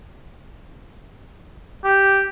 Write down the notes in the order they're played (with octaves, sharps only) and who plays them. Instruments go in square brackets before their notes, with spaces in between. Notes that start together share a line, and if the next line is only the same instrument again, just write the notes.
[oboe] G4